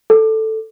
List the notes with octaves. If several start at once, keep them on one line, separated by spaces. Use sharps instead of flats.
A4